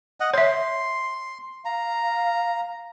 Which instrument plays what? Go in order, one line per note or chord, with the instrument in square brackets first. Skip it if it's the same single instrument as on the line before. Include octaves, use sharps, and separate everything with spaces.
[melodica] D#5 F#5
[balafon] C#5 E5 [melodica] C6
[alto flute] F5 [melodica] A#5